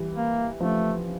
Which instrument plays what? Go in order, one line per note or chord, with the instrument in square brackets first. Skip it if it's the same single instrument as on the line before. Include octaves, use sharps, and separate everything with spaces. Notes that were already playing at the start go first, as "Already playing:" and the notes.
Already playing: [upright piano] E3 G3
[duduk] A#3
[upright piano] F3 [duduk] A3